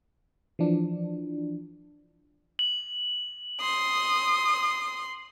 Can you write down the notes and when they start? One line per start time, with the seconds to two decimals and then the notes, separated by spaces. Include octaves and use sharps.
0.59 E3 F3 D4
2.59 F#7
3.61 C6 D#6